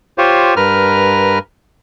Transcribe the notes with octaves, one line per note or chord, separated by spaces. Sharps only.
F4 G4 C5 C#5
G2 A#4 B4 F6